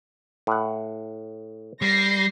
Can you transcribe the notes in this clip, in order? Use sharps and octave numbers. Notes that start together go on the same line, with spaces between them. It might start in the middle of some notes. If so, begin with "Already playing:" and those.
A2 F#5
G3 A#6 C7